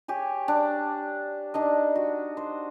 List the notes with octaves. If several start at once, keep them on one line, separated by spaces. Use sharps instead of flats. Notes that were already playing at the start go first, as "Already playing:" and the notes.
G4 C#5 G#5
D4
D4 D#4 D#5
F#4
C5